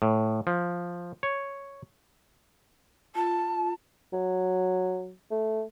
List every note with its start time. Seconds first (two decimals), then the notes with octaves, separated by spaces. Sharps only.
0.02 A2
0.47 F3
1.23 C#5
3.15 F4 A5
4.13 F#3
5.31 A3